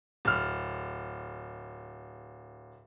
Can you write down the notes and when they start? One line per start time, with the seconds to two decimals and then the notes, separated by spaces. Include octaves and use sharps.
0.25 D1 F6